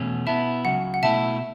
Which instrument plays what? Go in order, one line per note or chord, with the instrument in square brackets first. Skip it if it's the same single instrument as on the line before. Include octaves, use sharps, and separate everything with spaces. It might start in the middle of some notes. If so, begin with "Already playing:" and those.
Already playing: [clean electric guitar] E2 B2 A3 C#4
[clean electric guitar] B2 B3 E4 [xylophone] E5 A5
[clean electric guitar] C#2 C#3 F#3 [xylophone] F#5
[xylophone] F#5
[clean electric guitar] B2 A3 E4 [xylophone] E5 A5